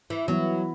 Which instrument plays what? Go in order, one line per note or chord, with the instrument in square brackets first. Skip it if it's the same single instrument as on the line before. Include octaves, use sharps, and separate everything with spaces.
[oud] E3
[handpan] E3 B3 E4 [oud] F#3